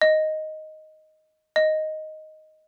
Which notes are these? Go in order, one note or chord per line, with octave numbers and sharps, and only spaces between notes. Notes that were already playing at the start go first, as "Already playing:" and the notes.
D#5
D#5